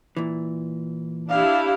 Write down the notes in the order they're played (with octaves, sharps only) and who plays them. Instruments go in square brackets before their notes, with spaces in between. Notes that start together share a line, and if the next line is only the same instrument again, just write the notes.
[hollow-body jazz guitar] A#2 E3
[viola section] D4 E4 G4 [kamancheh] F5